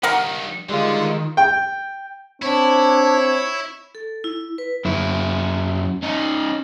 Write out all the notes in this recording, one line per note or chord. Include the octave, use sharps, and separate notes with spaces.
G2 D#3 A#4 F5 F#5
D3 D#3 G3 G#3 F4
G5
C4 D4 E4 C#5
A4
E4
B4
F#2 E4
C#4 D#4